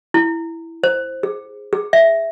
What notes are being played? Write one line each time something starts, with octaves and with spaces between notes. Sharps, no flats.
E4
C5
G#4
G#4
E5